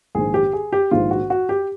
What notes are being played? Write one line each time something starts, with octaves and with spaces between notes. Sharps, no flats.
A#1 G#2 D#3 G#4
G4
G#4
G4
A#1 G#2 D#3 F4
F#4
F#4
G4